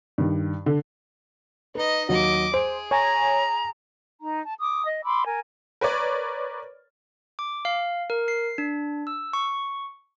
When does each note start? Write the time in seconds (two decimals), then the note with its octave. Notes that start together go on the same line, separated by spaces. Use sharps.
0.18 G2 D#3
0.66 D3
1.75 D#4 B4 D#5
2.09 D#2 F#3 D#5 D6
2.54 G#4 C5 D7
2.91 C#5 G#5 A#5
4.20 D#4 A#5
4.44 A5
4.60 D6 D#6
4.86 D#5
5.04 B5 C6 D6 E6
5.25 A#4 G#5
5.81 A#4 B4 C#5 D5
7.39 D6
7.65 F5
8.10 A#4
8.28 C7
8.58 D4
9.07 E6
9.33 C#6